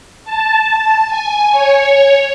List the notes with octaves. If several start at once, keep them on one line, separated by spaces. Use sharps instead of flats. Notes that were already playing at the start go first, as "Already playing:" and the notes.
A5
G#5
C#5